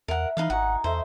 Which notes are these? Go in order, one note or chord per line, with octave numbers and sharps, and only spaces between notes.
E2 A#4 E5 F#5
E3 D#4 B4 D#5 F5
G#1 D#4 F#4 F#5 G#5
E2 A4 C5 D#5 E5